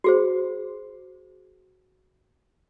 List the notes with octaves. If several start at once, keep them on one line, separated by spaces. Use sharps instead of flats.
F#4 G#4 C5